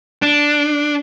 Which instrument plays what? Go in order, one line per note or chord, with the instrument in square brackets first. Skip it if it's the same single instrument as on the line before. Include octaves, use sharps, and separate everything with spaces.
[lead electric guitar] D4